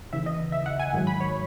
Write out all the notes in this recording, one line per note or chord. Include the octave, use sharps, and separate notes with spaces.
D#2 C#3 E3 E5
D#5
E5
F#5
G#5
G#2 D#3 F#3
B5
C#5